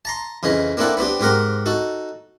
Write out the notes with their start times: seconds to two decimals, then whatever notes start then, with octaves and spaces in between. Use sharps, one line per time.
0.05 A5 A#5 C6
0.43 F2 C#3 E3 D#5
0.77 A#3 C4 D4 E4 A4 F#5
0.97 B3 C4 D4 G4
1.20 G#2 C4 G4 A#4 F#5
1.66 D#4 F#4 A4